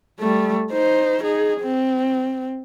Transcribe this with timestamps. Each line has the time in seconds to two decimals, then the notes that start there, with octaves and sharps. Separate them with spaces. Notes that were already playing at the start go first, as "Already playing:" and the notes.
0.20 G3 A3
0.72 D#4 C5
1.23 D#4 G#4
1.60 C4